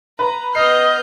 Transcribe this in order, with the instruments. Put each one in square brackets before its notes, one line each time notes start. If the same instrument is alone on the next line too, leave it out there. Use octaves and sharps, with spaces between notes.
[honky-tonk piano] B4 [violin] A#5
[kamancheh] B3 B4 [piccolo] D#5 [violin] F6 G6 [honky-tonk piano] C7